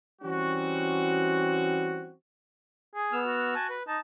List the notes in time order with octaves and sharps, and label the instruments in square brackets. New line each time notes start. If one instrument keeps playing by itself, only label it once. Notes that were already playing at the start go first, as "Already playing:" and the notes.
[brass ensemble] E3 G3 C4 C#4 F#4
[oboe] G#4
[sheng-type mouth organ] B3 E6 F6
[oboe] F#4
[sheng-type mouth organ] G#5 A5
B4
[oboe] D#4 [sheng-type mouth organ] A5